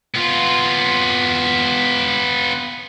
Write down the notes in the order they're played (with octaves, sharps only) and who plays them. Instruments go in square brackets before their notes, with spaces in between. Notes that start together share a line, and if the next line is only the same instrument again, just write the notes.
[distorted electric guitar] B3 F4